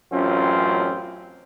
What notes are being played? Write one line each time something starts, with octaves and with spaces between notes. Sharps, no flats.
A1 F#2 C4 C#4 F4